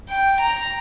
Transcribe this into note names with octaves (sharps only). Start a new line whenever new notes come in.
G5
A#5